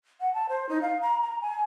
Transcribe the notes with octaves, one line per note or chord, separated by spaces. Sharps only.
F#5
A5
C5
D#4
F5
A#5
A#5
G#5